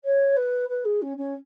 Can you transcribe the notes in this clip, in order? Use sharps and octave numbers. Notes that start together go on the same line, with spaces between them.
C#5
B4
B4
G#4
C#4
C#4